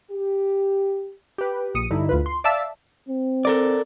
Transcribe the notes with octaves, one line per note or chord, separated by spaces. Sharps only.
G4
G4 B4
A#1 D#6 C#7 D#7
G2 D3 D#4 E4
D2 F4 B4
C6
D5 E5 F5 A5 E6
C4
A4 A#4 D5